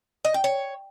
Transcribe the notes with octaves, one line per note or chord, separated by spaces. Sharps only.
D#5
G5
C#5